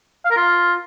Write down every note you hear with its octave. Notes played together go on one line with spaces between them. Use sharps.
F5
A#4
F4